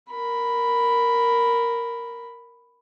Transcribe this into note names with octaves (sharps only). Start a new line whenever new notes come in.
A#4 B5